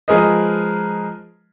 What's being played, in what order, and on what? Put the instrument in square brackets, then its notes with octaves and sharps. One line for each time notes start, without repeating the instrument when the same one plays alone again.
[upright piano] F3 G#3 G#4 A#4 B4 D#5